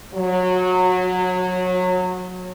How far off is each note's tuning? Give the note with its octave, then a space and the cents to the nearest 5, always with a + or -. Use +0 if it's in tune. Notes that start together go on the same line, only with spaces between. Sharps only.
F#3 -20